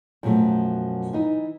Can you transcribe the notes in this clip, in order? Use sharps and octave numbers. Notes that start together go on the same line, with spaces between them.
F#2 B2 F3 F#3 A3
E3 D#4